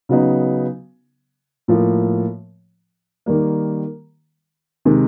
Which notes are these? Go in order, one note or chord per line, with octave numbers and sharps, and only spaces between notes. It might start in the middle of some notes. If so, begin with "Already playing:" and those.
C#3 F#3 B3 D#4
A2 F3 A#3
D#3 G3 A#3
C3 D#3 G#3